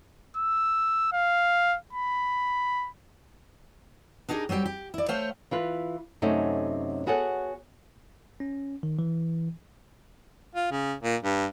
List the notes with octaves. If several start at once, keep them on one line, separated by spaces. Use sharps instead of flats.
E6
F5
B5
D4 D#4 G4 G#4 A#4
F#3 G3 C4 G4 G5
G4
E4 D5
A3 C5 C#5 F5 G5
E3 F4 B4
F#2 C3 A3 C#4 D#4 F#4
B3 F#4 G#4 A4 C#5 F#5
C#4
D#3
E3
F4
C#3
A#2
G2